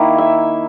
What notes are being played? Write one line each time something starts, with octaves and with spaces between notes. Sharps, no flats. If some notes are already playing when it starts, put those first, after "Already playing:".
Already playing: D#3 A#3 E4
E5